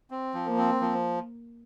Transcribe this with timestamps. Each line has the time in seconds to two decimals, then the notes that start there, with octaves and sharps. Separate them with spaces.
0.11 C4
0.34 F3
0.46 A#3
0.58 C4
0.81 F3